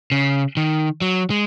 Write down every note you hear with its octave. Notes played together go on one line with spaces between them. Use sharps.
C#3
D#3
F#3
G#3